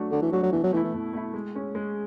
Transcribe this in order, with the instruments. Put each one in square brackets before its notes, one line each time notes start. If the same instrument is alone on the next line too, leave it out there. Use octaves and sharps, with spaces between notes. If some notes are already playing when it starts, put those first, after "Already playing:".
Already playing: [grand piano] F#3 A3 D4 F#4
[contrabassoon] D3 [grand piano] F#3
[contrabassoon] E3
[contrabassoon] F#3 [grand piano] A3 D4 F#4
[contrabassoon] F#3
[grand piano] B2 [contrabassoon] E3
[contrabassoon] F#3
[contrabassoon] E3 [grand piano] A3
[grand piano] E4
[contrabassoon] E3
[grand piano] B2
A3 E4
G#3
C#4 G#4
G#3